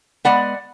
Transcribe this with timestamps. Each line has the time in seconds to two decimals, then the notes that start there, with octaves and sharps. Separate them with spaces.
0.25 G#3 B3 D5 F#5